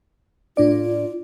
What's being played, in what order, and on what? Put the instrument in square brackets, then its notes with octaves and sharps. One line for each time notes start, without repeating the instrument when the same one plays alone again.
[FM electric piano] A2 D4 D5 [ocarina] F4